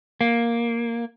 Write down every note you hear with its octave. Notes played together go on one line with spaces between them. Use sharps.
A#3